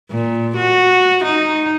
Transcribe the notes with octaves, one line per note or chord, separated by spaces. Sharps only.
A#2
F#4
D#4